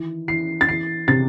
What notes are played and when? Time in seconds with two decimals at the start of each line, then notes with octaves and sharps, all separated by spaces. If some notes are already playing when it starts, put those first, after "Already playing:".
Already playing: D#3 E3
0.28 E3 C7
0.61 A6
0.69 E3 C7
1.08 C3 A6